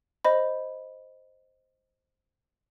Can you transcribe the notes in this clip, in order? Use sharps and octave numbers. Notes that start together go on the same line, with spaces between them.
C5 D#5 B5